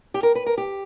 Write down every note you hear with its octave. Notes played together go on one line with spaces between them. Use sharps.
G4
A#4
B4
A#4
G4